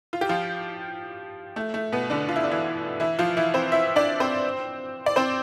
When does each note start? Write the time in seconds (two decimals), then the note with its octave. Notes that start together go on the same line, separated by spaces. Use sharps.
0.13 F4
0.21 G4
0.29 F3 F4
1.56 A3
1.74 A3
1.92 B2 B3
2.10 D3 D4
2.29 F4
2.36 E4
2.44 D4
2.51 E3 E4
3.00 E3 E4
3.19 F3 F4
3.37 E3 E4
3.54 C4 C5
3.72 E4 E5
3.96 D4 D5
4.20 C4 C5
5.06 D5
5.16 C4 C5